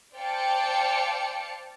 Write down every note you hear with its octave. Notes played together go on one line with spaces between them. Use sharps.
C5 D5 F5 G5 A5 C#7